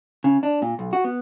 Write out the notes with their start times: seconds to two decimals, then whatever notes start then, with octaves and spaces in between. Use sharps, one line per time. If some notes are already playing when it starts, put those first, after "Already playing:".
0.24 C#3
0.43 D4
0.62 A#2
0.79 B1
0.93 F#4
1.04 B3